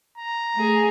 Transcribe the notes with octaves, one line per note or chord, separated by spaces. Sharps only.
A#5
A3 G#4